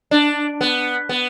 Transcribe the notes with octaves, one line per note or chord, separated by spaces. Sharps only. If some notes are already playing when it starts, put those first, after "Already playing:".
D4
B3
B3